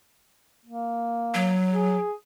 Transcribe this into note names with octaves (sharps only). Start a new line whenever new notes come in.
A#3
F#3
G#4